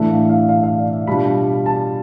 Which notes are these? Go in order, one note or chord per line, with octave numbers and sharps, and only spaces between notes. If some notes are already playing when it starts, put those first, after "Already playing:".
Already playing: A2 E3 A3 D4 E5
F5
F5
F5
F5
D5
E5
B2 G3 D4 F4 B5
A5